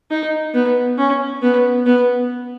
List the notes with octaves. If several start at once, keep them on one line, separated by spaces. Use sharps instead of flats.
D#4
B3
C#4
B3
B3